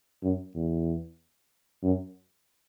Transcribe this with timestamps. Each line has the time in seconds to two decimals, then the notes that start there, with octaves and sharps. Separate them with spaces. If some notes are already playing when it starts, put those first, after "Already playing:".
0.23 F#2
0.55 E2
1.83 F#2